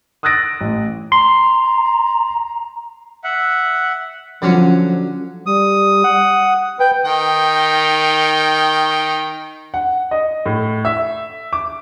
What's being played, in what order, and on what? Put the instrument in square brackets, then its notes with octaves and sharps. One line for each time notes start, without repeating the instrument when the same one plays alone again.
[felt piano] D#6 E6 F#6 A6 A#6 D7
A1
[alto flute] A#5 [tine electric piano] C6
[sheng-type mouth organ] E5 F#5
[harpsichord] D3 F#3 C#4 [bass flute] F3
[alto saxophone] G3 [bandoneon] D#6
[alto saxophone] F#5
[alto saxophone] B4 [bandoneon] G5
[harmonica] D#3 G5
[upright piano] F#5
D#5
A2
E5
D6